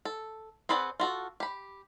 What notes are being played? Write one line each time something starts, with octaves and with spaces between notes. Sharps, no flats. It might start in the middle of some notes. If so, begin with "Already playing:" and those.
A4
C4 G#4 B4 D5 F#5
F4 F#4 A4
G4 B5